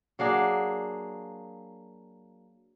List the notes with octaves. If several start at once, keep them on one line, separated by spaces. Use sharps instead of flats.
F#3 A#3 D4 G#4